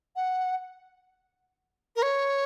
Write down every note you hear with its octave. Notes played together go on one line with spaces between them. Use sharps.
F#5
A#4
C#5